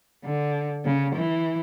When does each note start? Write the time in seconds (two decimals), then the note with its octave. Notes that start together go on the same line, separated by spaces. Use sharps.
0.24 D3
0.85 C#3
1.15 E3